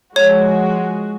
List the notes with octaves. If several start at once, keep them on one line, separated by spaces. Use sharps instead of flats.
F3 G#3 F#4 C#5